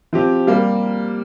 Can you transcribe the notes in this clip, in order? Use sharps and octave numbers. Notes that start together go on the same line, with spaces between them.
F3 C4 G4
G3 A#3